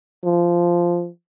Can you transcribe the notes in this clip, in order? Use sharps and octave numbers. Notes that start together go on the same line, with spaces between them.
F3